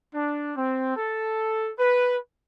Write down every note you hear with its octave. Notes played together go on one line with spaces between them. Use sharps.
D4
C4
A4
B4